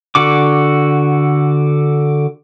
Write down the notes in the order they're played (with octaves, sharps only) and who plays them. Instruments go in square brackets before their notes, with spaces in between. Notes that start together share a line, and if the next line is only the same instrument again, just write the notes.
[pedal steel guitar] D3 F#4 D6